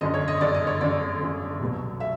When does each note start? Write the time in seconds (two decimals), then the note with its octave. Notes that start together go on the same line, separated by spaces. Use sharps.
0.01 G1 F#2 D3 D#5
0.14 C#5
0.28 D#5
0.41 G1 F#2 D3 D5
0.54 D#5
0.67 C#5
0.81 G1 F#2 D3 D5
1.20 G1 F#2 D3
1.60 C2 B2 F#3
2.00 E5